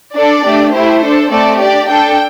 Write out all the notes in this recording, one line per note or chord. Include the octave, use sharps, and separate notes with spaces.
D4 A4 D5
A3 D4 G4
A3 E4 G4 C5
D4 A4
A3 C4 A4 D5
D4 G4 D5
D4 A4 G5